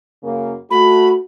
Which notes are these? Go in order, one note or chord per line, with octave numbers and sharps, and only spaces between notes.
F#2 C#3 A#3
A3 F#4 B5